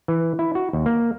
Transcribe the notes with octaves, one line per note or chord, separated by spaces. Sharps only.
E3
E4
F#4
D#2
A#3